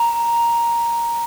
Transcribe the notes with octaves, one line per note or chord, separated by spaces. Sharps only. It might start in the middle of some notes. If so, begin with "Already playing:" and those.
Already playing: A#5